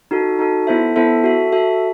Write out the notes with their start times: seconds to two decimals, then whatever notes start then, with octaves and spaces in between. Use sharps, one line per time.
0.11 D#4 F#4 A4
0.39 D#4 F#4 A4
0.67 B3 E4 A4 C5 E5
0.96 B3 E4 A4 C5 E5
1.24 F#4 A4 E5
1.52 F#4 A4 E5